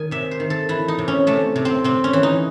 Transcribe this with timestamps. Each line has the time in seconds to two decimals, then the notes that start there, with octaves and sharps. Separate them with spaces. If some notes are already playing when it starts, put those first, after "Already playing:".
Already playing: D#3 G#5
0.11 C3 E5
0.31 C5
0.40 D#3
0.50 A4
0.69 E3 E4
0.88 D#4
0.98 C3
1.08 C#4
1.27 C3 A3
1.56 C3
1.65 C4
1.84 C3 C4
2.04 C#4
2.13 E3
2.23 D#4